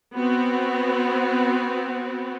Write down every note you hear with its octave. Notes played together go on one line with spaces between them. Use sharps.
B3 C4 F#4